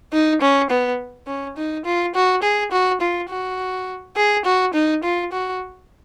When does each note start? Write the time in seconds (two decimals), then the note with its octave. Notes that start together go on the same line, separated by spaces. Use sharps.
0.13 D#4
0.41 C#4
0.70 B3
1.27 C#4
1.57 D#4
1.85 F4
2.15 F#4
2.43 G#4
2.72 F#4
3.01 F4
3.29 F#4
4.17 G#4
4.45 F#4
4.74 D#4
5.04 F4
5.32 F#4